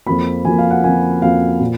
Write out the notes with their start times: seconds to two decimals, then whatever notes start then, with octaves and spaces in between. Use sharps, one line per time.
0.06 F2 F3 A#3 B5
0.45 F2 F3 A#3 G#5
0.58 F5
0.70 F#5
0.84 F2 F3 A#3 G#5
1.22 F2 F3 A#3 F5
1.60 A#2